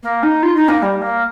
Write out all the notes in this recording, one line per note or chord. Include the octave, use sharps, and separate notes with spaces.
A#3
D#4
F4
D#4
A#3
G3
A#3